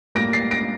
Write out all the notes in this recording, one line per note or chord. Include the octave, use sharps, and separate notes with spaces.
A2 G3 A#3 A#6 D7
A6 C7
A#6 D7